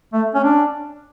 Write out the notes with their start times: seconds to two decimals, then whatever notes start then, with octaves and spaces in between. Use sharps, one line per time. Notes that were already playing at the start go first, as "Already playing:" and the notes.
0.13 A3
0.35 C#4
0.44 D4